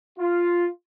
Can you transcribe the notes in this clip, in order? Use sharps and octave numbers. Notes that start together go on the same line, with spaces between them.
F4